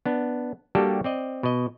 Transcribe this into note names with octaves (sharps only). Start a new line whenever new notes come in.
B3 D4
G3 A#3 D4 F#4 G4 A4
C4 D5 D#5
B2 D#5